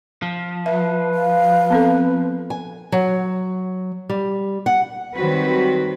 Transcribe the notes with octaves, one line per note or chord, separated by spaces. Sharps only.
F3
B4 E5
F5
B3 C4 A4
G#5
F#3
G3
F#5
D#3 F#3 G3 C4 F#4 B4